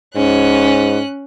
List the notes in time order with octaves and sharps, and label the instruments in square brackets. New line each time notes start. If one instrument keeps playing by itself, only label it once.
[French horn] G#2 [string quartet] C#4 F#6